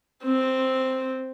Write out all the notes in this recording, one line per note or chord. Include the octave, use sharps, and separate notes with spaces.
C4